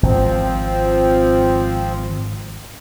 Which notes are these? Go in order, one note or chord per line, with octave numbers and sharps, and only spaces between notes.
G#1 F3 C4